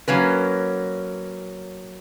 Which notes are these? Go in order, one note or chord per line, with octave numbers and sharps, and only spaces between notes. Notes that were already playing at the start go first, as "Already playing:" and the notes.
F#3 A#3 C#4 B4